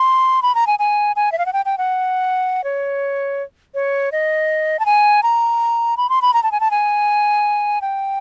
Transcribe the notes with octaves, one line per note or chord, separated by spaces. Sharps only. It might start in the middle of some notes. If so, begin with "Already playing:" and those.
Already playing: C6
B5
A#5
G#5
G#5
G#5
E5
F5
F#5
G5
G5
F#5
C#5
C#5
D#5
A5
G#5
A#5
B5
C6
B5
A#5
A5
G#5
A5
G#5
G5